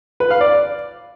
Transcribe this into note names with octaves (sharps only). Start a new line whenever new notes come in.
B4
F5
D5